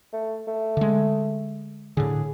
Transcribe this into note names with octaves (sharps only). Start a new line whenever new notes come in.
A3
A3
D3 G#3
A2 D3 G#4